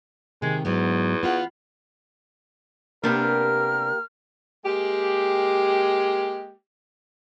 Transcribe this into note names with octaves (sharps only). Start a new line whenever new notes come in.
C3 D#3 G#3
E2 G#2 F#3 B3
B3 F4 F#5
C3 A#3 B3 D4 G4 A#4 F6
G#3 A#3 G4